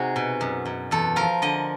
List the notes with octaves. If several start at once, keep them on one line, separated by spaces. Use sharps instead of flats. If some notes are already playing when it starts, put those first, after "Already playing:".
Already playing: C3 D#4 F#4 G#4
B2
F#2
F#2
E2 A4
F3 A#4
D3 D#5